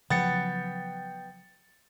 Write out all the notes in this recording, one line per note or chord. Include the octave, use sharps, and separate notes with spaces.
C#3 F3 F#3 B3 G5 A6 C#7